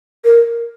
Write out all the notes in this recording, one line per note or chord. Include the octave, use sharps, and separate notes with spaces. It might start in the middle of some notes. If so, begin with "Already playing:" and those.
A#4